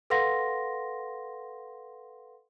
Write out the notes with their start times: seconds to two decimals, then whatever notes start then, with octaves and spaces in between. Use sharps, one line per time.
0.10 A4 B4 F5 F#5 C6 A#6